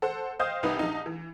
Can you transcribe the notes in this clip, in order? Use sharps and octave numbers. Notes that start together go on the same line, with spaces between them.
A4 C5 F#5
C5 D#5 F5 G5 D#6 G6
C2 D#4 B4
A#1 D#4
E3